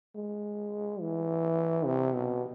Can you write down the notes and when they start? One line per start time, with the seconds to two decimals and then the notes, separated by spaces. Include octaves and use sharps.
0.15 G#3
1.01 E3
1.85 C3
2.14 B2